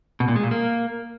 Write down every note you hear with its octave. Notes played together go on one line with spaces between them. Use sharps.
B2
A#2
G#3
A#2
A#3